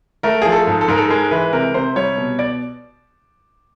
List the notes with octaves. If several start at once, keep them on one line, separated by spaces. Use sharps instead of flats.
A3 A#4
F3 G#4
A4
G#2
A4
G#2 A#4
A4
G#3 A#4
E3 B4
C3 A#4
C3 C5
G3 C#5
B2
D5